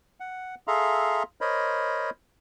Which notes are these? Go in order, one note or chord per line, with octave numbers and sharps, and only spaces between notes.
F#5
G#4 A4 E5 F5 A#5 C6
A#4 C5 C#5 D#5 B5